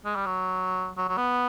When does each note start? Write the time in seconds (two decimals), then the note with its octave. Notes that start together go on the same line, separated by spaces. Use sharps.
0.05 G#3
0.16 G3
0.26 F#3
0.97 F#3
1.08 F#3
1.17 B3